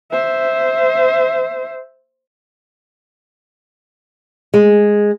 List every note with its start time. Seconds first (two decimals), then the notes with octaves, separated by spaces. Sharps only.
0.12 C5 E5
4.54 G#3